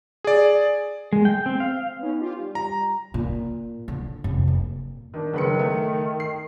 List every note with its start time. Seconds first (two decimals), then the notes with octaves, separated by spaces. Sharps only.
0.24 G#4 D5
1.13 G#3
1.25 G5
1.46 C4
1.60 F5
1.99 B3 C#4 D#4
2.20 F4 G4
2.39 G3
2.55 A#5
3.14 A#2
3.88 D3
4.24 F1
4.47 A#2
5.14 D#3 D4
5.34 F#1 D#3 B4 C#7
5.59 A3
6.20 C7